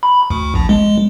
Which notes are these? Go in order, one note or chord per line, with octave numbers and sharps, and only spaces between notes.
B5
D2
A#1
G#3